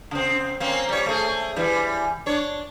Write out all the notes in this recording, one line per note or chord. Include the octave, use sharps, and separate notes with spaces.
C#3 C4
A#3 C4 C#4
G3 C#5
A3 G#4
E3 G3
D4 C#5